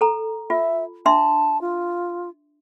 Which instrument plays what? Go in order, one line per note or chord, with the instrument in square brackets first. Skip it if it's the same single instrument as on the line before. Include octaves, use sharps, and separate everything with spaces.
[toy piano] A4 A#5
[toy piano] F4 [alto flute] E5
[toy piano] D4 E5 C6 [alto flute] A5
[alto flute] F4